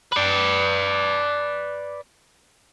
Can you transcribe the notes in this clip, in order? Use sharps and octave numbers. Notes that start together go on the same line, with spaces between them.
B4 D5